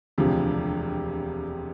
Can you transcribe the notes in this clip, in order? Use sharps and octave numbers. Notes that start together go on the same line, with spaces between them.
E1 D2 C3 F3